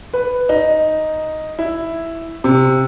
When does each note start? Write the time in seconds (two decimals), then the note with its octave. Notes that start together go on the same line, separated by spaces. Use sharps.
0.13 B4
0.49 D#4
1.59 E4
2.44 C3